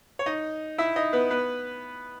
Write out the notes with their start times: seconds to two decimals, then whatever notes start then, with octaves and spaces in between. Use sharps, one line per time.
0.19 C#5
0.26 D#4 D#5
0.78 E4 E5
0.96 D#4 D#5
1.13 B3 B4
1.31 B3 B4